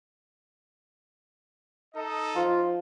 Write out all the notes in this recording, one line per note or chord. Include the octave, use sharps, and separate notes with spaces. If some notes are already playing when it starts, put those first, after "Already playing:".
D#4 A4 D#5
F3 F4